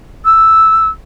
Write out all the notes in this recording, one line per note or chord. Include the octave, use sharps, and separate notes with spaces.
E6